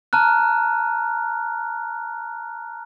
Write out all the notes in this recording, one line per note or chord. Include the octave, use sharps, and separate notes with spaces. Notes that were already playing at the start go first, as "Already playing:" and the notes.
A5 A#5 F6 F#6